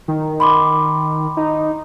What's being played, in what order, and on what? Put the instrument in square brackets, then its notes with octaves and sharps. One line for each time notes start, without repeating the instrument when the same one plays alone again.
[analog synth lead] D#3
[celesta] B5 C6 D6
[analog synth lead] D#4